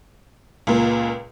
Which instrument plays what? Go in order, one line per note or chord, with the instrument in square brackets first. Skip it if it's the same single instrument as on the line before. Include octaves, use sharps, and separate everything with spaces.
[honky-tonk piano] C#2 A#2